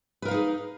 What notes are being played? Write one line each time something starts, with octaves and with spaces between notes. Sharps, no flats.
D#4 G#4 A#4 B4 F5